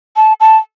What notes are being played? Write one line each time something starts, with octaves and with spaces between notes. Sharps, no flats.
A5
A5